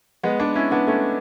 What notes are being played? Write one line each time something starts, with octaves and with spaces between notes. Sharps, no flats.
G#3 B3
B3 D4
C#4 E4
B3 D4
A3 C#4